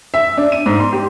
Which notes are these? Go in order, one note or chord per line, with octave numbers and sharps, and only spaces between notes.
E5
D4
D#7
G#2
C6
G4